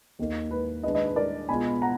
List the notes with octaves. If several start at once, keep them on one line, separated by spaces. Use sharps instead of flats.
D#2 D#3 A#3
B4
D#3 G#3 D4 B4 D#5
B4 D#5
B4
A#4 D5
B2 G#3 B3 F4 G#5 B5
F#5 A#5